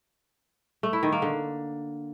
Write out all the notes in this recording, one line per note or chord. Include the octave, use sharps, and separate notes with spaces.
A3
E4
D#3
A#3
D3